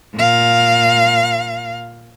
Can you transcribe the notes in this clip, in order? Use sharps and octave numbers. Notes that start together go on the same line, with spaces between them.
A#2 F5